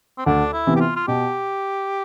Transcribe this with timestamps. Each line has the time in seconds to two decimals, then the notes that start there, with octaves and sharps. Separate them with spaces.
0.18 C4
0.26 D2 D4
0.53 E4
0.67 C3 E3 B3
0.76 G4
0.81 F4
0.96 F4
1.08 B2 G4